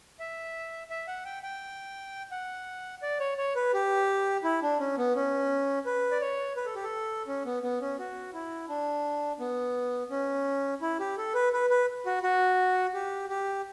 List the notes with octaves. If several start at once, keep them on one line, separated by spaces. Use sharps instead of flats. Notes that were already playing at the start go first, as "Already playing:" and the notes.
E5
E5
F#5
G5
G5
F#5
D5
C#5
C#5
B4
G4
E4
D4
C#4
B3
C#4
B4
D5
C#5
B4
A4
G4
A4
C#4
B3
B3
C#4
F#4
E4
D4
B3
C#4
E4
G4
A4
B4
B4
B4
F#4
F#4
G4
G4